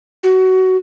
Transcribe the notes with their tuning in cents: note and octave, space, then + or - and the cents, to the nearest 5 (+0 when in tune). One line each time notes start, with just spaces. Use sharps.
F#4 +20